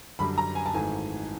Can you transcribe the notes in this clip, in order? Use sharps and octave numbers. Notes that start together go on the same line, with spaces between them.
F#2 D3 G3 B5
A#5
G#5
A5
G#1 G#2 E3 A3 G#5